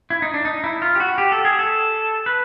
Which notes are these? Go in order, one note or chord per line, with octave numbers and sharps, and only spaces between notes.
E4
D#4
D4
D#4
E4
F4
G4
F#4
G4
A4
G#4
A4
B4